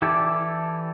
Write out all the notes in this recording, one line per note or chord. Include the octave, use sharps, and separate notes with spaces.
E3 E4 G4 A4 D5